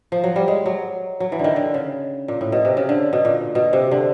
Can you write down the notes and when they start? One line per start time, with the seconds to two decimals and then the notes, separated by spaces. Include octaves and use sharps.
0.12 F3
0.24 F#3
0.36 G3
0.48 G#3
0.66 F#3
1.20 F#3
1.32 E3
1.39 D3 D#3
1.56 D3
1.74 C#3
2.28 A#2
2.41 A2
2.52 B2
2.65 C3
2.77 C#3
2.89 D3
3.13 B2
3.25 A#2
3.55 B2
3.73 C3
3.91 D3